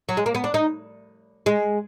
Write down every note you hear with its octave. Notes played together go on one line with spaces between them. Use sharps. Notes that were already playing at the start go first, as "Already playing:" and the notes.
F#3
G#3
A#3
B3
D4
D#4
G#3